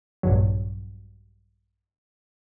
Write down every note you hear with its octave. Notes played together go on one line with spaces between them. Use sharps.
A#1 G2 F#3